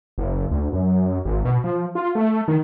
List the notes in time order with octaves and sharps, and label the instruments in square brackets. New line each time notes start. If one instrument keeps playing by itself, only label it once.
[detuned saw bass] F#1
D2
F#2
G#1
B2
F3
F4
A3
D#3